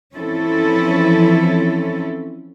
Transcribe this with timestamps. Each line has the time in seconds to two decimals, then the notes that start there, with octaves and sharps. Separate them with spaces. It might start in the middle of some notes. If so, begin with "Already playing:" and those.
0.15 E3 F3 C4 C#4 E4 A4